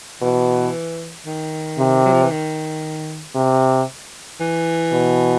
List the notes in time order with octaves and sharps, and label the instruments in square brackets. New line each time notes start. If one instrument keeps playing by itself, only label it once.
[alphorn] B2 [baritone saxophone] E3
[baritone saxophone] D#3
[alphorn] C3
[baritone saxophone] F#3
F3
E3
D#3
[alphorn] C3
[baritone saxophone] E3
[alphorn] B2